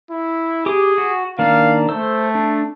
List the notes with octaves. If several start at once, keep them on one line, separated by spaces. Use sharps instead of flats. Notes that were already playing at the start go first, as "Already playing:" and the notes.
E4
G4 G#4 D6 D#6
F#4
D#3 A#3 D4 F5
A3 C5 E6
D4